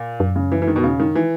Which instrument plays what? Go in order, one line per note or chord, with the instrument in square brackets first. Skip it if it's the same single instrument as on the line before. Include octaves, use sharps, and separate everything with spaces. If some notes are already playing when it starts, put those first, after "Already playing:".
Already playing: [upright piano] A#2
[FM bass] F#2
[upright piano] C#3
E3
E3
D#3
B2
[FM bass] E2 [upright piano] C#3
[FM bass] F#2 [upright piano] D#3
[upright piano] E3